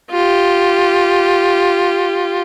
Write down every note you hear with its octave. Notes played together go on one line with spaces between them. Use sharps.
F4 G4